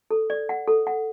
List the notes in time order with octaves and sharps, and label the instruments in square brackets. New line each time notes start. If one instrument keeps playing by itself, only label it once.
[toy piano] A4
D5
F#5
A4
F#5